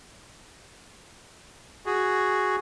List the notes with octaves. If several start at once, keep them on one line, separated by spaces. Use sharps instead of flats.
F#4 G#4